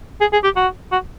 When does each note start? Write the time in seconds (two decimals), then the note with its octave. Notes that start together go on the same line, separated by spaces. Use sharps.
0.21 G#4
0.33 G#4
0.44 G4
0.56 F#4
0.92 F#4